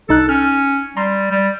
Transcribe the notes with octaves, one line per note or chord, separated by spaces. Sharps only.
C2 D#4 A4 F#6
C#4 F6
G3 A#5 C6
G3